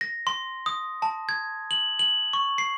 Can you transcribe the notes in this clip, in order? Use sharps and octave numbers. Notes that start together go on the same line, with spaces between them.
A#6
C6
D#6
A5
G#6
F#7
F#7
C#6
C7